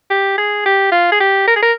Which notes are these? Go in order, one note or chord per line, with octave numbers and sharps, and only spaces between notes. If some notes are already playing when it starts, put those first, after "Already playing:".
G4
G#4
G4
F4
G#4
G4
A#4
G#4
A#4